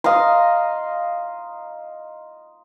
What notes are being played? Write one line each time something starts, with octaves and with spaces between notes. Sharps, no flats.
D#5 F5 A#5 C6